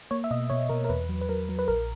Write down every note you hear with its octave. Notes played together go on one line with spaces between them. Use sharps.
A#3 C#5
E5
B2 D#5
B2 C#5
B2 A#4
A#4
E2 B4
F#3
B4
F#3 A#4
F#3
B4
A#1 A#4